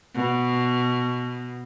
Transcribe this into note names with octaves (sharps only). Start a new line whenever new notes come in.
B2